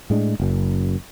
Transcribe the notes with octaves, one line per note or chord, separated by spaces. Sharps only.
A2 G#3 D4
F#1 F#2